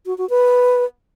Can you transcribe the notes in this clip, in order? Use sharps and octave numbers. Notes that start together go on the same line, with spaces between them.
F#4
F#4
B4